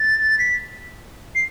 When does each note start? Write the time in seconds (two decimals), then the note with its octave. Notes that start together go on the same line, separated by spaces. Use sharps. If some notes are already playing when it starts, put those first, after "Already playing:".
Already playing: A6
0.39 B6
1.35 C7